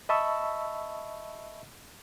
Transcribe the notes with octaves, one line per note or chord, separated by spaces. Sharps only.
D#5 E5 A5 B5 C#6 E6